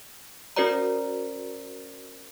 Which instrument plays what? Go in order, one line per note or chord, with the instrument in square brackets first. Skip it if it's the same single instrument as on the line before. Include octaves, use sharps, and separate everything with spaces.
[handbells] C#4 F#4 A#4 C5 D5 A#5